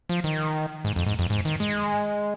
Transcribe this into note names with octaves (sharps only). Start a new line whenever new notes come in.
F3
D#3
G#2
F2
G#2
F2
G#2
D#3
G#3